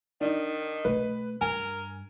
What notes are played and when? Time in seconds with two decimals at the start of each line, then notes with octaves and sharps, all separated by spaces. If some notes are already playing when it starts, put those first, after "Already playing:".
0.21 D#3 D4 D#4
0.85 B2 A3 B4
1.41 G2 A#4 G#5